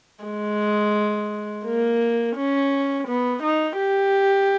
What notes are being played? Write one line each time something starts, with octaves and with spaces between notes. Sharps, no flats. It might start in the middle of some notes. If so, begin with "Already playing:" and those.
G#3
A#3
C#4
B3
D#4
G4